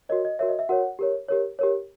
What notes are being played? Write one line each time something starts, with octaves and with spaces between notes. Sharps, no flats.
F#4 A#4 C#5 D#5
D#5
F#4 A#4 C#5 E5
D#5
E5
F#4 A#4 C#5 F#5
G4 A#4 C#5
G4 A#4 C#5
G4 A#4 C#5